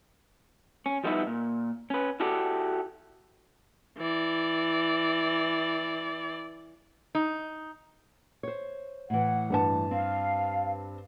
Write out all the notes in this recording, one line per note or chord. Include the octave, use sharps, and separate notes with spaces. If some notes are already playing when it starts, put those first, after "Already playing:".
C#4
F3 G3 B3 D#4 E4
A#2
C#4 B4
E4 F#4 G4 A4 D5
E3 D5
D#4
C5 C#5
A2 E3 F#5
G2 B4 A5
C4 F5